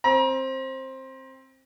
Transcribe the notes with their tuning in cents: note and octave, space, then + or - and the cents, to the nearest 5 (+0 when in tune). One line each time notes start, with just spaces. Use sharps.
C4 +15 A#5 +40